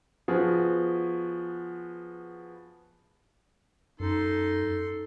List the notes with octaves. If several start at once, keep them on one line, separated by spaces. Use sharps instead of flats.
F3 B3 F#4 G#4
F#2 D#4 A4 C6